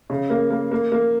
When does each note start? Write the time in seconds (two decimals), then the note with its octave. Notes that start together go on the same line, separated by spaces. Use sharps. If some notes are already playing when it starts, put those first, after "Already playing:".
0.10 C#3
0.30 A#3
0.50 A#3
0.71 A#3
0.92 A#3